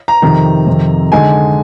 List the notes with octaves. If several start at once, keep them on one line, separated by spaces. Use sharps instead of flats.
A#5
F2 C3 D#3
F2 C3 D#3
D3 G#3 D#4 G#5